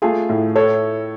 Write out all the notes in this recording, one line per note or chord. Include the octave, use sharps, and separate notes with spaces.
A3 F4 G#4
A2
A4 C#5